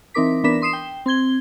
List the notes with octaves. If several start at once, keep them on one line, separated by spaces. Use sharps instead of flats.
E3 C4 D#4 A#4 D6 B6
E3 B3 D4 A#4 B6 E7
C6 D#6 C7 E7
G5
C4 C6 G#6 G7